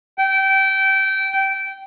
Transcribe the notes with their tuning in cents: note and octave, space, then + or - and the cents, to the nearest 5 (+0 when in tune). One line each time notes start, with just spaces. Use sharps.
G5 -20